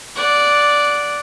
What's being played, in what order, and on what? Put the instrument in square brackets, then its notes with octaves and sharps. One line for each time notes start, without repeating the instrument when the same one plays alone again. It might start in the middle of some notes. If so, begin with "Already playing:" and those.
[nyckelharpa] D5 F#5